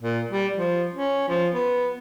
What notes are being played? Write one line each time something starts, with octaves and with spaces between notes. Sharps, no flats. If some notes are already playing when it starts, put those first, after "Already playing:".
A#2
G3
F3
C#4
F3
B3